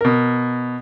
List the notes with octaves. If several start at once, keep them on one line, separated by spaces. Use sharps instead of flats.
B2 A#4